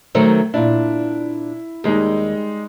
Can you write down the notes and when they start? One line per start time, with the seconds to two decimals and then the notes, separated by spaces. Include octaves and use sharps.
0.15 D#3 F#3 A3 C5
0.54 A#2 D4 E4
1.84 D#2 G3 G#3 D#4